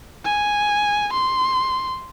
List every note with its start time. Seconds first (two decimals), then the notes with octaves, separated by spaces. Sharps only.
0.25 G#5
1.13 C6